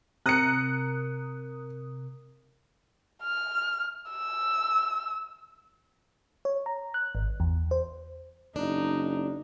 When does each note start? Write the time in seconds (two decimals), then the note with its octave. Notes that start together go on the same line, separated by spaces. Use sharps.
0.26 C3 A#4 D#6 F#6 C#7
3.23 F6
4.09 E6
6.45 C#5
6.66 A#5
6.94 F#6
7.15 G#1
7.40 E2
7.71 C5
8.56 F#1 D4 D#4